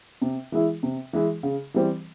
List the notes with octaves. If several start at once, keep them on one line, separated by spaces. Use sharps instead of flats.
C3
E3 G#3 E4
C3
E3 G#3 E4
C#3
E3 G3 C4